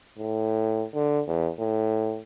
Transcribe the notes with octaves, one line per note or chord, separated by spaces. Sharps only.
A2
D3
E2
A2